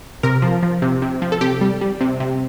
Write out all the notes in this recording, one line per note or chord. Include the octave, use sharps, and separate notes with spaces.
C3 A#4
F3
F3
C3
C3
F3
A4
C3 G4
G3
G3
C3
C3